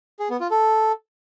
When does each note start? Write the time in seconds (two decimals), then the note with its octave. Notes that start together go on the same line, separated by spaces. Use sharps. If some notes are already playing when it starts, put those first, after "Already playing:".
0.20 G#4
0.30 B3
0.40 F4
0.51 A4